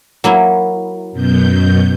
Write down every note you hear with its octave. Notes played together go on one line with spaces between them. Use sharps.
F#3 A#3 E4
F#2 B2 G6